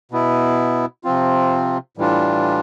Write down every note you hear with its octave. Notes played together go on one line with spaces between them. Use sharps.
B2 B3 E4
C3 F3 C4 F4
A2 E3 G3 D4 F4